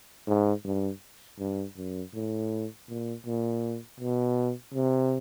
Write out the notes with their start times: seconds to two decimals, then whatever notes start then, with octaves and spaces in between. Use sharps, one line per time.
0.27 G#2
0.64 G2
1.39 G2
1.76 F#2
2.14 A2
2.88 A#2
3.26 A#2
4.00 B2
4.74 C3